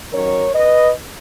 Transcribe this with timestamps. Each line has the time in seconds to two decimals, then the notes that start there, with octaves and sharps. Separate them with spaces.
0.13 D#3 F#3 C#4 A#4 C#5
0.54 B4 D#5